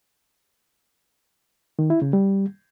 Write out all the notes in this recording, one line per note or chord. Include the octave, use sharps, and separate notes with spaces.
D#3
E4
C#3
G3